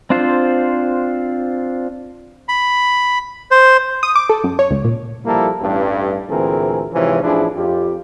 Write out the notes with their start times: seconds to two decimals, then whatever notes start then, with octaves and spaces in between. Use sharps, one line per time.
0.10 C4 D4 F4 C5
2.49 B5
3.51 C5
4.03 D#6
4.16 D6
4.29 A4
4.44 F#2
4.59 C#5
4.71 C#2
4.85 A#2
5.25 F3 G3 A#3 E4 A4
5.61 A1 G2
6.29 D2 A#2 E3 C4 G#4 A#4
6.93 G#2 C3 E3 F3 C#4
7.23 A1 F3 D4 E4 G#4
7.55 F2 F4 G4